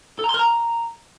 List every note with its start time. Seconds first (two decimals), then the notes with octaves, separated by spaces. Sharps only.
0.19 A4
0.24 A#5
0.29 C6
0.34 A#4
0.39 A#5